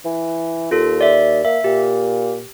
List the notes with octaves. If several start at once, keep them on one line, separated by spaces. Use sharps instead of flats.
E3
D#2 F4 A4
D5 E5
A#3 E5
A#2 G4